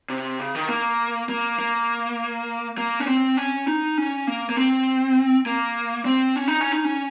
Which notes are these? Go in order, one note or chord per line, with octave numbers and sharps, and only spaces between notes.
C3
C#3
D#3
A#3
A#3
A#3
A#3
C#4
C4
C#4
D#4
C#4
A#3
A#3
C4
A#3
C4
C#4
D#4
C#4
D#4
C#4